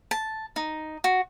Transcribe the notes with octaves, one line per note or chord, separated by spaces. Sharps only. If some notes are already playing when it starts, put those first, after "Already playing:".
A5
D#4
F#4